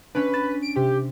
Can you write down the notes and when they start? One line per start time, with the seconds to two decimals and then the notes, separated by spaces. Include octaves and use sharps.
0.15 C#4 D4 B4
0.33 A6 B6 E7
0.62 D7
0.76 C3 G4